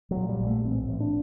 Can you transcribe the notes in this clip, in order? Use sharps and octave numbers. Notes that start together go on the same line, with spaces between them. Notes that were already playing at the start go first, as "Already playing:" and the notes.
F#3
A#2
G3
A#1
A3
A1 C4
A1
D4